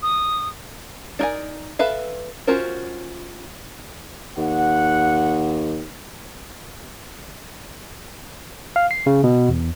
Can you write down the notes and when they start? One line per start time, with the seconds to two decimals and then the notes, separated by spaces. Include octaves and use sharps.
0.02 D#6
1.19 D4 D#4 A#4 D5 G#5
1.79 A4 B4 E5 F5
2.47 C#4 F4 F#4 A#4 C5
4.38 D#2 F#5
8.76 F5
8.91 C7
9.06 C#3
9.24 B2
9.49 E2